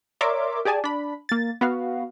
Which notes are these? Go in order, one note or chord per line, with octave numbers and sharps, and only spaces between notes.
A#4 C#5 D5 E5 C6 D6
G4 G#4 D5 G#5 A5
D4 B5
A#3 A6
B3 F#4 F5